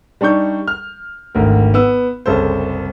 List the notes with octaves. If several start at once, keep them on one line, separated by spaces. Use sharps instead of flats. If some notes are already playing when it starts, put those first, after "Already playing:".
G3 D4 D#4 C#6 G6
F6
G#1 D2 A#4
B3 E6
F#1 C2 C#3 A4 C5